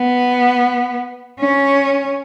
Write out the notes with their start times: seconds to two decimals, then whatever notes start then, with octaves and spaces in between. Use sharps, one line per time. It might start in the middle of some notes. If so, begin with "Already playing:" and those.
Already playing: B3
1.40 C#4